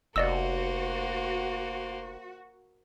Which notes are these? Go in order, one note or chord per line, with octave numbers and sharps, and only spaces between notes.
F1 A#3 F#4 C5 D5 D#5 E6